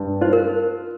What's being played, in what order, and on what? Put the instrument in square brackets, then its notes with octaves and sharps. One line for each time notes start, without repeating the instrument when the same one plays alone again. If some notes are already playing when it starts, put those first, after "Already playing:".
Already playing: [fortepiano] G2
[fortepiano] F4 [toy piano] C5
[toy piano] A#4